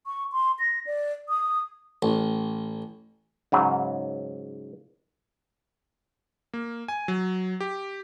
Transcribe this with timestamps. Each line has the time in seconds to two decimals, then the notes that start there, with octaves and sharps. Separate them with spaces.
0.07 C#6
0.32 C6
0.59 A#6
0.86 D5
1.29 D#6
2.02 A1
3.52 G#2 C#3 F#3
6.54 A#3
6.88 G#5
7.08 F#3
7.60 G4